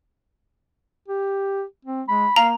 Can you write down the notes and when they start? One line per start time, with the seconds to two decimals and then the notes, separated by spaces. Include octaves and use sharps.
1.08 G4
1.85 C4
2.08 G#3 B5
2.36 A#3 F5 A#5